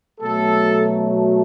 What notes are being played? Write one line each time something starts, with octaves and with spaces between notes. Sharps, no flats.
B2 F#3 A3 A4